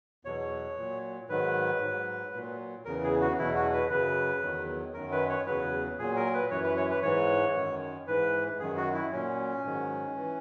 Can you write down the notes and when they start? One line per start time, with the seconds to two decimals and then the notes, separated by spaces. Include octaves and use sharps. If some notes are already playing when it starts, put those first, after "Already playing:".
0.25 E2 B2 F#3 C#5
0.77 A#2 F#3
1.29 G#2 D#3 F#3 B4
1.81 G#2 F#3
2.33 A#2 F#3
2.85 E2 C#3 E3 A#4
3.03 G#4
3.21 F#4
3.38 E2 B2 F#3 E4
3.55 F#4
3.73 B4
3.90 F#2 C#3 F#3 B4
4.42 E2 D#3 F#3
4.94 F#2 D#3 F#3 A#4
5.12 B4
5.29 C#5
5.46 E2 C#3 F#3 B4
5.98 A#2 F#3 G#4
6.16 A#4
6.34 B4
6.51 F#2 E3 C#5
6.64 B4
6.77 C#5
6.90 B4
7.02 G#2 E3 C#5
7.55 F#2 D#3 F#3
8.07 G#2 E3 B4
8.59 F#2 D#3 F#3 G#4
8.77 F#4
8.94 E4
9.12 A#2 F#3 C#4
9.64 G#2 D#3 F#3
10.15 E3